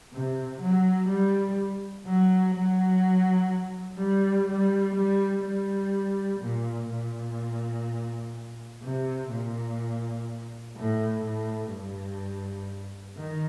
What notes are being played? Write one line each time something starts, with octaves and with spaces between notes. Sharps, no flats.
C3
F#3
G3
F#3
F#3
G3
G3
G3
G3
A#2
A#2
C3
A#2
A2
A2
G2
D#3